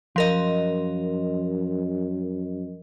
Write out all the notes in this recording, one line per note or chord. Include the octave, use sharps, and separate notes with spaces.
F#2 F3 A#4 D#5